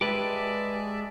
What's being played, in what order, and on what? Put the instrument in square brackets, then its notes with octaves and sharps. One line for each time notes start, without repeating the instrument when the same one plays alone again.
[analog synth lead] G#3 [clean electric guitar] G4 B4 [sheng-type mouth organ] D5 E5 A5